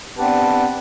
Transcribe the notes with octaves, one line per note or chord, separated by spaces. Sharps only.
B3 C4 D4 G4 B4 A5